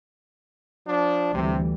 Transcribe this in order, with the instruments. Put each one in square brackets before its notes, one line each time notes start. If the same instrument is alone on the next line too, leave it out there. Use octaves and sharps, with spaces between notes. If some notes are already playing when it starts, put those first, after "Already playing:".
[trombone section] F3 D4
[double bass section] D2 E3 G3 [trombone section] C3